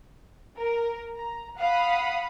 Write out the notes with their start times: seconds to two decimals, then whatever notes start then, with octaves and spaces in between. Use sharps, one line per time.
0.58 A#4
1.16 A#5
1.58 F5 F#5 B5 D#6